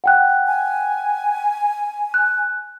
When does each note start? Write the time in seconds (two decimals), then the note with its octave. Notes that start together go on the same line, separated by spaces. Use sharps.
0.04 F#5 G5 F#6
0.47 G#5
2.14 F#6